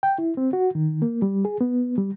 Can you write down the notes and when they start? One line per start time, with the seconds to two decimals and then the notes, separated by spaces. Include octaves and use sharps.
0.03 G5
0.18 E4
0.37 C4
0.53 F#4
0.75 D#3
1.02 A#3
1.22 G3
1.45 G#4
1.61 B3
1.98 G3